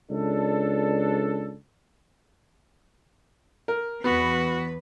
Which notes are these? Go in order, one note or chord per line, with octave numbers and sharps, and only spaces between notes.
C#2 D4 A4
A#4
E2 B3 F#4 B4